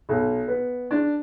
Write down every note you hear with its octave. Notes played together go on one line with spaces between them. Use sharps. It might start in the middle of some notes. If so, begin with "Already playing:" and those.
B1
B3
D4